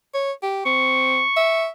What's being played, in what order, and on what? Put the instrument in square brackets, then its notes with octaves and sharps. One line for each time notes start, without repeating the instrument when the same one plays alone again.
[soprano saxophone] C#5
G4
[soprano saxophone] C4 [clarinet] C#6
[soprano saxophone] E5